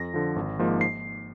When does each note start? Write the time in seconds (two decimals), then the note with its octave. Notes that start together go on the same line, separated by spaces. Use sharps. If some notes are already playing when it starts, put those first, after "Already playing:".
Already playing: F2 A#6
0.14 D3 F3
0.36 G#1
0.59 G#2 F3 A#3
0.81 C7